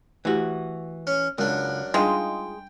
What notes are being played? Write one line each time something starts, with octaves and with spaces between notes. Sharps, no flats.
E3 A3 E4 F#4 G4
C#4
C#2 F#2 G#3 D4 A#4
G3 G#3 D4 D#4 F4 G#4 G5